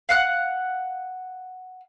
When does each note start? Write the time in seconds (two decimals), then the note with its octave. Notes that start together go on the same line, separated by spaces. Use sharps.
0.09 F5 F#5 F#6